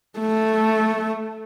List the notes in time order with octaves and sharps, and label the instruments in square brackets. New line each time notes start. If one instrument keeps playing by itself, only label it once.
[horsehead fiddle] A3